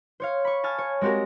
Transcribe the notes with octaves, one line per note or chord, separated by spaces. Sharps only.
C5 C#5 F5
B5 C#6
G#5 A5 F6
C#5
G#3 C4 F#4 G4 A#4